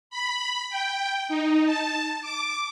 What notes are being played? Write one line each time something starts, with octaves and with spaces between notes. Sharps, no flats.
B5
G5
D#4
A5
D6